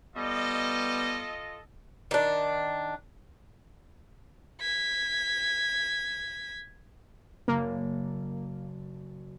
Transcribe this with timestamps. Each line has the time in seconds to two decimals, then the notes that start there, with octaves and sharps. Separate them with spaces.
0.16 G3 B3 F4 A4 D#5
2.11 D#3 D4
4.61 G#6 B6
7.48 F#1 A#3